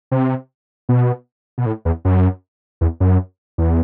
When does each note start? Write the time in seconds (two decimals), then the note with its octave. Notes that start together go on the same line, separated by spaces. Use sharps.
0.11 C3
0.89 B2
1.58 B2
1.66 A2
1.85 E2
2.05 F#2
2.81 E2
3.00 F#2
3.58 E2